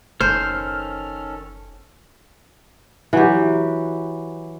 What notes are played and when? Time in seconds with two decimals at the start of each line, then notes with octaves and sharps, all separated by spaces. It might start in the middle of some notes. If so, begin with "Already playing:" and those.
0.21 F#1 D#3 C#4 A4 C5 F6
3.13 E3 F#3 G4